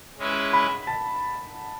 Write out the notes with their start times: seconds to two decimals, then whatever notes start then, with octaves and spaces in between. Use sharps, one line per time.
0.18 G#3 C#4 E4 B4 E5
0.53 B5
0.87 A5